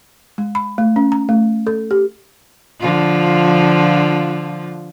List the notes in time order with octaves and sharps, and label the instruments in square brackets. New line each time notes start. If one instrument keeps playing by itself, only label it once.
[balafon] G#3
B5
A3
C#4
A#5
A3
A4
G4
[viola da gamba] D3 F3 F4